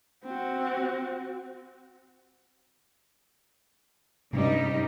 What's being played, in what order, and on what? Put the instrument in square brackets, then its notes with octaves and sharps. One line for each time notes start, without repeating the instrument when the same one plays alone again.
[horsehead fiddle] C4 F#4
[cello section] G2 G3 D#4 [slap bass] C3 C4 C#4